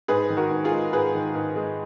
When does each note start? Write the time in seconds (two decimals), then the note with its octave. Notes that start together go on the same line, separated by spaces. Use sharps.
0.08 G#2 G#4 B4
0.30 D#3
0.37 F#4 A#4
0.51 G#2
0.64 F4 G#4
0.72 G#3
0.93 G#2 G#4 B4
1.14 D#3
1.35 G#2
1.56 G#3